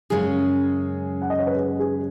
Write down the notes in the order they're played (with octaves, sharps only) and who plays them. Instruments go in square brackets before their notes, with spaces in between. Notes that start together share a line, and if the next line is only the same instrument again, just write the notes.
[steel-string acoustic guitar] F#2 C#3 G#3 C#4 [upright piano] G#4
[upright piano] F#5
D#5
C#5
B4
G#4
G#4